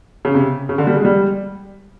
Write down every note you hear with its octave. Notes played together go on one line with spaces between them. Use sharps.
C#3
C3
C#3
D3
G3
G#3
G3